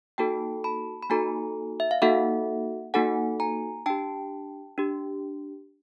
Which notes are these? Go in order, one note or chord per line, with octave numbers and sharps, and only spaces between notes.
A#3 D#4 F#4 A4 G5 A5
A5 B5
B5
A#3 D#4 F#4 A4 G#5 A#5
E5
F5
A#3 D#4 F#4 A4 E5 F#5
A#3 D#4 F#4 A4 F#5 G#5
G#5 A#5
D4 G4 G5 A5
D4 G4